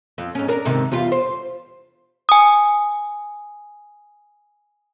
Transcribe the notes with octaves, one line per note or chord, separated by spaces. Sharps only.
F2
G#2 C#4
D4 A#4
G#2 C3 D#3
E2 G3 F4
C5
G#5 D#6